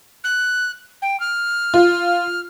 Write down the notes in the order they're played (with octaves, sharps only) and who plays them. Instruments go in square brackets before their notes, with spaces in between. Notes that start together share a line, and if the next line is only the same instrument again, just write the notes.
[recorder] F#6
G5
F6
[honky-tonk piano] F4